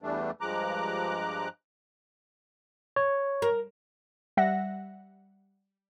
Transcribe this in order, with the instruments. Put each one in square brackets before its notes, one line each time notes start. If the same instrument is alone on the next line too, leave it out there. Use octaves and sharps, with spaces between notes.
[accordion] E2 E3 G3 A3 D4
G2 F3 G#3 A#5 D6 F#6
[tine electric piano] C#5
[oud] A#4
[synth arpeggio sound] G3 E5 F#5 A#6